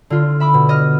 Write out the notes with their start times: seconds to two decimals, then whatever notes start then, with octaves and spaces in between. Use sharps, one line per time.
0.10 D3 F4
0.40 E5 B5 D6
0.54 B2
0.69 D#5 F6